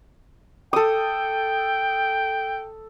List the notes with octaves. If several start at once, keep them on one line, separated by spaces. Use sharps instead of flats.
A4 G5 D#6